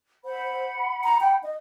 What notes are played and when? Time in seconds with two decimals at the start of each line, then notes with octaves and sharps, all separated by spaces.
0.25 C5 F#5 B5
1.04 A#5
1.20 G5
1.43 D#5